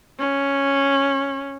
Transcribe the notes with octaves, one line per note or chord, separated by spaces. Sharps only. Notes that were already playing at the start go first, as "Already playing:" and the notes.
C#4